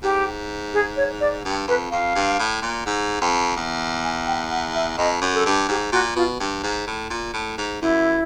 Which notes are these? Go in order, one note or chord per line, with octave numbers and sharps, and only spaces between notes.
G#2 G4
G#4
C#5
D5
G2
F2 B4
F2 F5
G2
A2
A#2
G#2
F2
E2
G#5
G5
F#5
E5
F2 D#5
F#2
A4
G2
G#2 G4
A#2 F#4
B2 F4
G2
G#2
A2
A#2
A2
G#2
F#2 E4